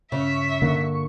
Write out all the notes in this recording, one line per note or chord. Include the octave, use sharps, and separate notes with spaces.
G2 C#3 E5 C#6
D3 A#3